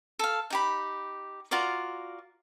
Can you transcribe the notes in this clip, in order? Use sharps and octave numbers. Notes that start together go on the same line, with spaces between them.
A4 F5
D#4 G4 B5
F4 F#4 A#4 D5